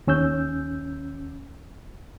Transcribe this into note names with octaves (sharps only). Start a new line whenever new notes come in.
D#2 C#4 E6 G6